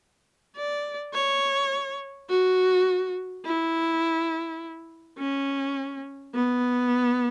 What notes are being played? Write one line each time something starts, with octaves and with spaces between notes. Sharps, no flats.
D5
C#5
F#4
E4
C#4
B3